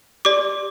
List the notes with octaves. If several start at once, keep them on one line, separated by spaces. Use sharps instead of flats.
G4 D5 D6